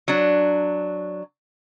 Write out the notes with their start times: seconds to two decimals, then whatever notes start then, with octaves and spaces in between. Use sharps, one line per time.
0.08 F#3 D4